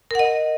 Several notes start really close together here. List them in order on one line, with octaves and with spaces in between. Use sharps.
A#4 F#5 D#5